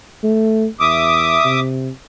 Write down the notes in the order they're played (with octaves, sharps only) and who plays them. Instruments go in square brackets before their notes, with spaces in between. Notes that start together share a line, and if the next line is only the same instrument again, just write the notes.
[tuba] A3
[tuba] E2 [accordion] E5 D6 D#6
[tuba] C3